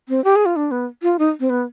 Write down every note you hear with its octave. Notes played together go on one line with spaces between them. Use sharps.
C4
G4
G#4
F4
D4
B3
F4
D#4
C4
B3